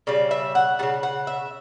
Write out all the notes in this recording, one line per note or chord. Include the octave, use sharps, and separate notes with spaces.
C#3 G3 D5
E5
F#5
C#3 G3 F#5
F#5
E5